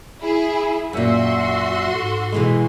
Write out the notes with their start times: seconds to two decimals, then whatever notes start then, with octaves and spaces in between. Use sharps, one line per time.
0.21 E4 G#4
0.93 F#2 A#2 F#4 E5 C6 E6
1.93 G#2 A4
2.32 B2 E3 G#3